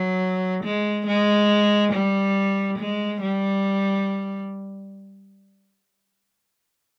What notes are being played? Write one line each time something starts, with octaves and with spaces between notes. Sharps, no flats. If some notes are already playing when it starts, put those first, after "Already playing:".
Already playing: F#3
G#3
G#3
G3
G#3
G3